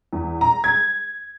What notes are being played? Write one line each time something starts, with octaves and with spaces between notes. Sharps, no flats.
E2
A#5
G#6